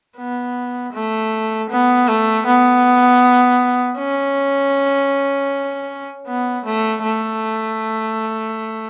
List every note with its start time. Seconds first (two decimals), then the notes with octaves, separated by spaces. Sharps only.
0.17 B3
0.93 A3
1.70 B3
2.08 A3
2.46 B3
3.98 C#4
6.27 B3
6.65 A3
7.03 A3